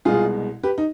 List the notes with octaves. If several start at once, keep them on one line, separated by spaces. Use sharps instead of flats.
C2 B2 G#3 F4 G#4
G4 B4
D#4